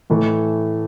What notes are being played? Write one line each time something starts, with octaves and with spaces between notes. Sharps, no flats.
A2 E3 A3